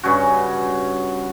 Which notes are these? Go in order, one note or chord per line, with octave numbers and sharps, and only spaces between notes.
G2 C#3 C#4 F#4